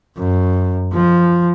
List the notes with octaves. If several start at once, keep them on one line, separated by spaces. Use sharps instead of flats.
F#2
F3